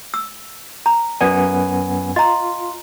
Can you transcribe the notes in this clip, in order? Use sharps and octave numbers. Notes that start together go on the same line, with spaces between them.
E6
A#5
F#2 B3 D5 G#5
F4 D#5 A#5